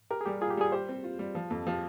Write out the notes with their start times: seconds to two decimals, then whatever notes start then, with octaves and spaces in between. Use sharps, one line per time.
0.11 G4 A#4
0.21 G#4
0.26 G3 G4
0.41 F4 G#4
0.51 G4
0.57 G3 G#4
0.72 G4 C5
0.89 C4
1.04 F4
1.19 G3
1.35 F3
1.50 F2
1.67 F3 G4